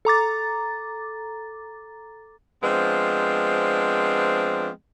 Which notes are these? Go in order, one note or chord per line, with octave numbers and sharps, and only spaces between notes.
A4 A#5 D6 A6
F3 G#3 B3 C4 D4